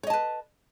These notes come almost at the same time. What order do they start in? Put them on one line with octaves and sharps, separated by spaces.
C#5 D#5 A5 B4